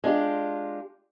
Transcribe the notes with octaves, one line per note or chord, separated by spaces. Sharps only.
G#3 D4 F4 G4